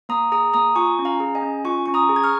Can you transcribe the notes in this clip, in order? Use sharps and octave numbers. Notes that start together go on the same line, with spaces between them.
A#3 A#5 D#6
G#4 A#5 D#6
A#3 A#5 D#6
F4 G#5 C#6
C#4
F5 A#5
G#4
D#5 G#5
C#4
F4 G#5 C#6
C#4 C#6
A#5 D#6
G#4
G#6
C#6 F6